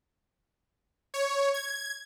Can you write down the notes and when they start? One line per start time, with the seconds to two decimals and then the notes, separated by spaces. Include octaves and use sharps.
1.14 C#5
1.54 G#6